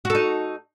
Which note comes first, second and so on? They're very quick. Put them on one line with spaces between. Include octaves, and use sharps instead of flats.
F#4 A4 D#4